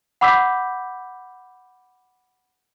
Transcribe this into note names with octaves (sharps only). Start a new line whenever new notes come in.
F#5 B5 D6 E6 G6 B6